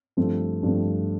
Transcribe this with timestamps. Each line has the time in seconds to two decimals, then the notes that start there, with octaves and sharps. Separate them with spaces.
0.17 G2 F3 A3 C4
0.63 G2 F3 A3 C4